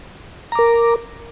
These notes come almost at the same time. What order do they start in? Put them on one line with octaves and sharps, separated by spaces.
A#5 D6 A#4